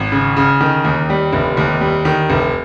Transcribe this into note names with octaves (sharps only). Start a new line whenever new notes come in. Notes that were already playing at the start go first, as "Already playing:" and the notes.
Already playing: G#1
C#3
C#3
D#3
D#2
G3
F1
D#2
G3
D#3
F1